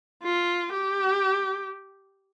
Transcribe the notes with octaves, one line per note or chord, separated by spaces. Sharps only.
F4
G4